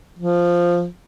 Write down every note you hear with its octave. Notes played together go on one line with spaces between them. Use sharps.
F3